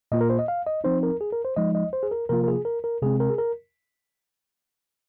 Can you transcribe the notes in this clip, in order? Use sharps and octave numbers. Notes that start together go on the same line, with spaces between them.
A#2 A#3 F4 D#5
A#4
C5
D#5
F5
D#5
F3 C4 D#4 C5
A#4
G#4
A#4
C5
F3 G#3 D#4 D#5
D#5
C5
G#4
A#4
C3 F3 A#3 F4 A#4
A#4
G#4
A#4
A#4
C3 G#3 C4 G#4
A#4
G#4
A#4